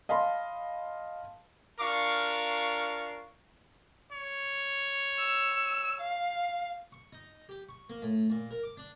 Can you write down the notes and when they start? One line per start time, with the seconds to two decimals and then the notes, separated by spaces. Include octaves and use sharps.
0.09 D#5 F5 A5 B5 C6
1.80 D4 F4 A#4 F5 C#6
4.12 C#5
5.19 E6
6.01 F5
6.92 C#6
7.13 D#4
7.49 G4
7.69 C#6
7.90 A#3
8.02 A2
8.30 A#2
8.51 A#4
8.63 D6
8.77 D4